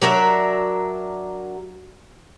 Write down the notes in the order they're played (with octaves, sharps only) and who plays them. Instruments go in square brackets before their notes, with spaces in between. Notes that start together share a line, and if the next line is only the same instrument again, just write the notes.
[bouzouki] F#3 D4 A#4 E5